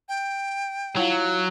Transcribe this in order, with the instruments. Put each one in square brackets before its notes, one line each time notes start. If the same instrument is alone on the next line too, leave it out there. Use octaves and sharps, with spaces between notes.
[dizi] G5
[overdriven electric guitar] F#3 [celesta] E4 F4 F5